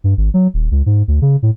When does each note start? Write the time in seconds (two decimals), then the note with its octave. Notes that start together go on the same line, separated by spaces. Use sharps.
0.04 G2
0.17 G#1
0.34 F#3
0.54 D#1
0.71 C#2
0.86 G#2
1.08 D2
1.22 C#3
1.42 A2